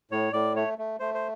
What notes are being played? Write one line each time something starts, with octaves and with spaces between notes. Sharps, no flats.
A2 C#5
A2 D5
A3 C#5
A3
A3 C5
C5